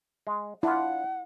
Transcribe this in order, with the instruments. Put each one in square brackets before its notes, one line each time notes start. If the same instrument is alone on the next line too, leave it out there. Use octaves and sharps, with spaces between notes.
[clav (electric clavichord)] G#3
[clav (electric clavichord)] D4 F4 [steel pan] E4 [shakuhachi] F#5